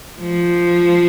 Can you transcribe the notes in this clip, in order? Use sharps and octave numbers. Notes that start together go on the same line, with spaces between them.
F3